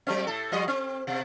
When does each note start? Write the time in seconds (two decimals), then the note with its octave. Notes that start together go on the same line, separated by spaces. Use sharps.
0.07 F#3 A3 C4
0.27 A2 A4
0.52 F3 G3 D#5
0.68 C4
1.07 B2